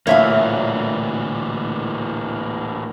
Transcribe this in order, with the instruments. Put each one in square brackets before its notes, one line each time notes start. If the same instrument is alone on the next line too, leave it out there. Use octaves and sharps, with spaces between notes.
[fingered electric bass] D1 D2 A#2 [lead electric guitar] E3 A#3 [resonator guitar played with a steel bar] C#5 E5 F5